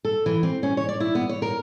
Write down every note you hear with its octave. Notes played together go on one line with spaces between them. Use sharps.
A4
E3
C4
C#4
C#5
D5
E4
B3
C#5
A#4